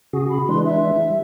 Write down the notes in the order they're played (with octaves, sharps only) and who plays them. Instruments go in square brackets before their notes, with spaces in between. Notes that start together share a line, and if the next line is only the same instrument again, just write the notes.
[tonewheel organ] C#3 F#4 G#4
[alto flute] B5
[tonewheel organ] E3 G#3 D4 [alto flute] C6
[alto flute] E5
[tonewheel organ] G3